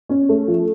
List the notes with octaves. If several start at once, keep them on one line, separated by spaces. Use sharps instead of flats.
C#4
A3
F3